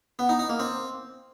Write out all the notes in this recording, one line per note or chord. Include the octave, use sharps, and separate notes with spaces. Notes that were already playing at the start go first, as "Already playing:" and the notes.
B3
D#4
D#4
A#3
C4